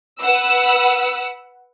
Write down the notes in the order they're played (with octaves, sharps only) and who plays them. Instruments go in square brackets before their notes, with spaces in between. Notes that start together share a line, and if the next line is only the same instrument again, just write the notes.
[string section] B4 F#5 E6